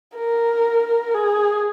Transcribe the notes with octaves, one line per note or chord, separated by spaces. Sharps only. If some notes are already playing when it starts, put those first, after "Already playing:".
A#4
G#4